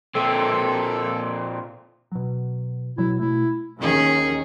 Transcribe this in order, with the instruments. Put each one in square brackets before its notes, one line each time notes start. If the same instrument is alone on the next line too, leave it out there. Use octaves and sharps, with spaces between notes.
[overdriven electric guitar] A#2 C4 [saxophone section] A4
[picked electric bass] B2 F#3
[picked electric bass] B2 F#3 [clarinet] E4
[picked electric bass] B2 A3 [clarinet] E4
[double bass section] D#2 D#3 [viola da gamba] C#4 G#4